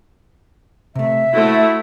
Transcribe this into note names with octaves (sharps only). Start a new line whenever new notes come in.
C3 A3 E5
A3 E4 F#4 C5